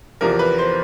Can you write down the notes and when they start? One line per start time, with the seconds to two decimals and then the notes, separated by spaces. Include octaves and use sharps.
0.21 E2 C3 F3 A#4
0.39 B4
0.59 C5